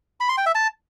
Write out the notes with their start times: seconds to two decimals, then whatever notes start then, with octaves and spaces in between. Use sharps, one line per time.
0.20 B5
0.29 C6
0.38 G5
0.46 E5
0.55 A5